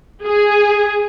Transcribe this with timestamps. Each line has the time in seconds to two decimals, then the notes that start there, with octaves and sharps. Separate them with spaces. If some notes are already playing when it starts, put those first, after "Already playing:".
0.23 G#4